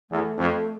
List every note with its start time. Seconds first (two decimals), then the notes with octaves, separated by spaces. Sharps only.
0.11 E2 A3
0.38 F2